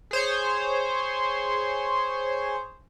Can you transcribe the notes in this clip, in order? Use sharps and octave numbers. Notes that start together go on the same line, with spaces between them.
G#4 C5 C#5